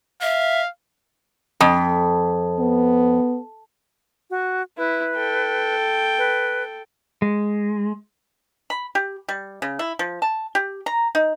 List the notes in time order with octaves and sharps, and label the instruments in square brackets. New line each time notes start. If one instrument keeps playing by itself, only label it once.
[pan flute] E5 [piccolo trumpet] F5
[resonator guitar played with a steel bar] F2
[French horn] B3
[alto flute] F#4
[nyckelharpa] E4 [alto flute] B4
[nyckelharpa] A4 G5
[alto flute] B4
[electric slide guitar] G#3
[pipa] B5
G4
G3
C#3
E4
F3
A5
G4
A#5
D#4